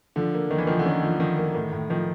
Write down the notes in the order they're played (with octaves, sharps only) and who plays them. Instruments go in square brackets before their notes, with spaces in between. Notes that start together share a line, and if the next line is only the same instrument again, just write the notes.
[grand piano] D3 [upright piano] F3
[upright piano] A#3
[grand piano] D#3 [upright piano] A#3
[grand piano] E3
[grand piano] D#3 [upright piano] F3
[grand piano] D3
[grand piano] D#3 [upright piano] C#4
[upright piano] F3
[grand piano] D#3 [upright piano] F3
[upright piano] A#3
[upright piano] A2 [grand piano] D#3
[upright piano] A2
[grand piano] D#3 [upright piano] F3